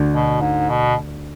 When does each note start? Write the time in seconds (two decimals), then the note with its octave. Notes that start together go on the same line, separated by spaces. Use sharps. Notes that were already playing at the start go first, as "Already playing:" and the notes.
Already playing: D2 D3
0.13 B2
0.41 G#2
0.70 B2